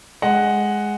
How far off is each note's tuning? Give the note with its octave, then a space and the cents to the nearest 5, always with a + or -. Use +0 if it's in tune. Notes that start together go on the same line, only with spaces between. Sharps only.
G#3 +0 F#5 +0